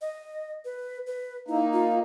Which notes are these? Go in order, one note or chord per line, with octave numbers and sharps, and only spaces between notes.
D#5
B4
B4
A#3 D#4 E4
F4